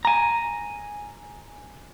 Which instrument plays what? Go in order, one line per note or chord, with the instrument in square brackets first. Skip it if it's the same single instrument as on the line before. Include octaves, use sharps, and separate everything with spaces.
[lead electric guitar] G#5 A#5